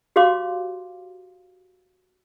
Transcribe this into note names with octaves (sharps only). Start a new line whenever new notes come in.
F#4 G4 C#5 F5 C6 D6